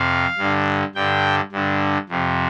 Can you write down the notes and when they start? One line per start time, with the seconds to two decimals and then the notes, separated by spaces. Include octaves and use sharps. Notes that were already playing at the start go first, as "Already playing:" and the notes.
Already playing: F2 C3 F5
0.38 G2 D3
0.95 G2 D3 G5
1.52 G2 D3
2.09 F2 C3